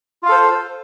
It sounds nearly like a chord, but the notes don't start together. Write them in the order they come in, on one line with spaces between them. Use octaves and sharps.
F4 F5 A4 C5